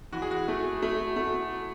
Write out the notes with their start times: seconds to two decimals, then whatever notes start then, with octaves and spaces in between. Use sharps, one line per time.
0.13 E3 F#4
0.22 G#4
0.31 F#4
0.48 A3
0.82 A3
1.16 A3